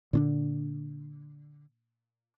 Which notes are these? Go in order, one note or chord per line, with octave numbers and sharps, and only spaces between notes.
A#2 D3 C#4 D4